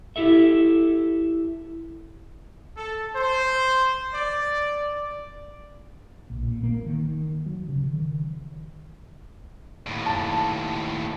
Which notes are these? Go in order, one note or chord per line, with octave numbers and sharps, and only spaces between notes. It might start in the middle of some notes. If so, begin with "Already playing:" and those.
E4 G4 A4 E5
A4
C5
D5
A#1
A#2
A#3
D#3
F#3
C#3
D#3
D#2 A2
A5